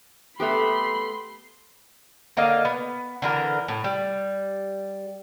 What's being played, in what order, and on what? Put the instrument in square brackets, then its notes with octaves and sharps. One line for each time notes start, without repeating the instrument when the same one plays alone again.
[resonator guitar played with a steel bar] A3 B3 G4 [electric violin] B5 C6
[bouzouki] D3 A#3 D#5 F5
B3
D3 E3 A#4
A2
G3